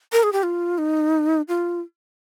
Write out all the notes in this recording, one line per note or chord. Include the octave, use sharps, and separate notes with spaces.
A#4
G#4
G4
F4
D#4
F4